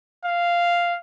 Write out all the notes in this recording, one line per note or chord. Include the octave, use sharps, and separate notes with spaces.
F5